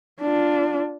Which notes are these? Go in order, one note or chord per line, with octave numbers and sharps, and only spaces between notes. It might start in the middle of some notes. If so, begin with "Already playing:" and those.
D4 F4